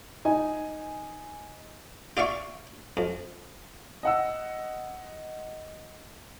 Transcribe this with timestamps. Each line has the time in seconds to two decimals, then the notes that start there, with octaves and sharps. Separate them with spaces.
0.25 D#4 G#5
2.17 F4 D5 E5 F5 C#6
2.97 F2
4.03 D#5 F#5 E6